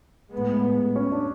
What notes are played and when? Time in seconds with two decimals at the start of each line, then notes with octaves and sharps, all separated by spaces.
0.33 A2 G#3 B3
0.96 C#4
1.12 D4